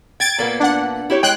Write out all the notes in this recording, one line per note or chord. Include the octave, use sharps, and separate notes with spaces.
G5 G#6 A6 D7
A#2 A#3 B3
D4 F#5
E4 G4 C#5
G#3 G5 F#6